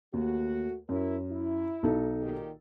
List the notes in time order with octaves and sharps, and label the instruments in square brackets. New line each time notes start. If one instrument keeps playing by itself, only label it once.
[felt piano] D#2 [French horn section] A3 F#4
[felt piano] F#2 [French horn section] E4 A#4
[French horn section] E4
[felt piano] B1 D#4 A4
[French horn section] A#2 D#3 G4